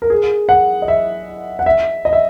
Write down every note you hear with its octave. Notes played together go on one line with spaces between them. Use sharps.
A#4
G#4
F#5
D#5
E5
F#5
E5
D#5
E5